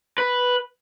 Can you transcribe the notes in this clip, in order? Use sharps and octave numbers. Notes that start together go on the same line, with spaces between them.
B4